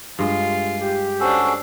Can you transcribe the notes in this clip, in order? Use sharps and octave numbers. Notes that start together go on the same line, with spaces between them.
G2 G#3 F4
G4
C#4 D4 F#4 A4 C5